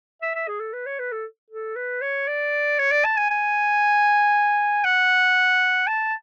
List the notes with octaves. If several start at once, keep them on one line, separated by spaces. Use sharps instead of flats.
E5
E5
G#4
A4
B4
C#5
B4
A4
A4
B4
C#5
D5
C#5
D5
A5
G#5
G#5
F#5
A5